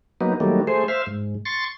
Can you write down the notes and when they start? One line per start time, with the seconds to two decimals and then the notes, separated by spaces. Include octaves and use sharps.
0.21 F#3 A#3 B3 D#4
0.40 D#3 F#3 G3 A3 A#3
0.67 A3 G#4 C5
0.88 C5 E5 F5
1.07 G#2
1.45 C6 C#6 A6